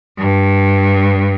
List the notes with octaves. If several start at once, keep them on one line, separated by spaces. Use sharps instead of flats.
G2